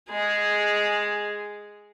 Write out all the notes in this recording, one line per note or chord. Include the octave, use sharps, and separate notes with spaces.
G#3 G#4